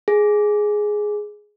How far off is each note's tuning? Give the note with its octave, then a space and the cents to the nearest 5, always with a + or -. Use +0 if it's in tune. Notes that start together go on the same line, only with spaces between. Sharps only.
G#4 +5